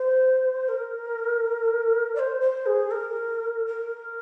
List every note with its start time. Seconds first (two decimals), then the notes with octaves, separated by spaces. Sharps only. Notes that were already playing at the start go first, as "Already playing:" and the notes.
Already playing: C5
0.65 C5
0.68 A#4
2.15 D5
2.19 C5
2.41 C5
2.66 G#4
2.91 A#4
3.66 A#4